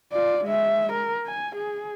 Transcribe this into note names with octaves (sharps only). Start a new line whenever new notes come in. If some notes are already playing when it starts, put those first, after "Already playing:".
F4 D5
G#3 E5
A#4
G#5
G#4